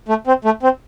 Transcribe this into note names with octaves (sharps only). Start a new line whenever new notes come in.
A3
C4
A3
C4